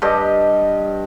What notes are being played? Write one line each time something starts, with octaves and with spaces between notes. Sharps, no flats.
G2 D4 G4 D#5